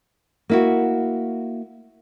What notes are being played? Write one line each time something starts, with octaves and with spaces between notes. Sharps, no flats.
A#3 E4 F#4